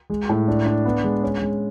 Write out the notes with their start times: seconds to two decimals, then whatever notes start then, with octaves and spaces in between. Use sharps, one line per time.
0.10 G#3
0.29 A2
0.48 D4
0.66 D4
0.85 B3
1.04 G#3
1.23 C#4
1.42 G#3